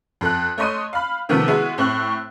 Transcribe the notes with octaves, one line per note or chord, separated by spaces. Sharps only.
F2 A4 F#6
A3 C#5 D#5 C6 D#7
F5 B5
C3 D#3 F3 A3 B3
G#3 B3 E4 F#4
A2 C4 C#6 F#6